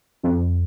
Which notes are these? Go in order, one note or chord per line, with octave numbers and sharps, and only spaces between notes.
F2